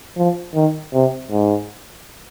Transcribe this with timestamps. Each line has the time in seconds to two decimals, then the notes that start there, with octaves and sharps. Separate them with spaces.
0.17 F3
0.55 D#3
0.94 C3
1.31 G#2